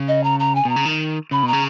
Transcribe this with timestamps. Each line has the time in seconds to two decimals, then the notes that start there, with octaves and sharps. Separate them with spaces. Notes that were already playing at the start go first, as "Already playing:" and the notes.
Already playing: C#3
0.08 D#5
0.24 A#5
0.40 A#5
0.55 G#5
0.65 B2 A#5
0.76 C#3
0.85 D#3
1.31 C#3 B5
1.43 B2 A#5
1.53 C#3